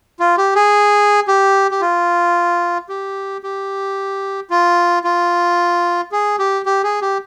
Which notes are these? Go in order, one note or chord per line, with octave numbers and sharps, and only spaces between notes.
F4
G4
G#4
G4
G4
F4
G4
G4
F4
F4
G#4
G4
G4
G#4
G4